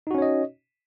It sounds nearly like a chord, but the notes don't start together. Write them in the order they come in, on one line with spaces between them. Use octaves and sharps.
D#4 F#4 C#4 C#5 D#5